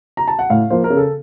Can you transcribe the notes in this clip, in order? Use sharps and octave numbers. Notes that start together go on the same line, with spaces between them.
A#5
A5
F#5
A2 F5
F3 A#3 C5
A#4
C#3
A4